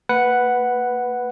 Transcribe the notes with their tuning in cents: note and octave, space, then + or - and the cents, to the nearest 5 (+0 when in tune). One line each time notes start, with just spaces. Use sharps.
A#3 -35 B4 +0 F#5 +0